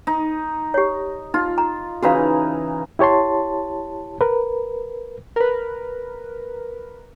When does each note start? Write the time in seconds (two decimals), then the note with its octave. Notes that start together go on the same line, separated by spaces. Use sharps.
0.07 D#4
0.74 G4 C#5
1.34 D#4 F4
1.58 A#5
2.03 C#3 E3 D#4 F#4 B4 F5
2.99 E4 G4 C#5 A5 C6
4.21 A#4 B4
5.36 A#4 B4